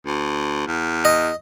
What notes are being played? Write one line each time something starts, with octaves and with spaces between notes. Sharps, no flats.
D2
E2
D#5